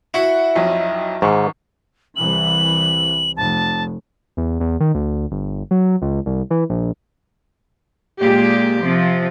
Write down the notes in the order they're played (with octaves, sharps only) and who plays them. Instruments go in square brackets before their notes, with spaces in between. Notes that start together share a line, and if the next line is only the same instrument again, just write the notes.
[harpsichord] E4 [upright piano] F#4 F#5
[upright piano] B1 F2 F#3
[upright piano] G#1 C#6 [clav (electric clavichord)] G#2
[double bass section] C2 E3 [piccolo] F#7
[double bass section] F1 [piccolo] A5
[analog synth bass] E2
E2
D#3
D2
G1
F#3
C#2
C2
E3
A#1
[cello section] A#2 G#3 G4
C3 F3